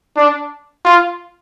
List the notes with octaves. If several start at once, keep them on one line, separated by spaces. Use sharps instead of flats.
D4
F4